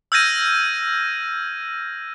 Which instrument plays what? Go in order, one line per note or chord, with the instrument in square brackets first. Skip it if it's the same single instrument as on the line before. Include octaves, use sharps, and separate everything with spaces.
[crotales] E6 F6 G6 G#6 A#6 D#7